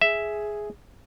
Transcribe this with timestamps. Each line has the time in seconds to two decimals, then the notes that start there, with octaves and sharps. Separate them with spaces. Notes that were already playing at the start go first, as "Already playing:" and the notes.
0.01 G#4 E5